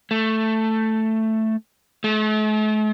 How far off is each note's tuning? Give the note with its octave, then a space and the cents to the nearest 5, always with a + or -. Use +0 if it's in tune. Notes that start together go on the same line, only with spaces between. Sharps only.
A3 +5
A3 -45